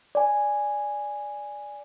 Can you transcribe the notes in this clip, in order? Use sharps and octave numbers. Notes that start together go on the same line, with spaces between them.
D5 G#5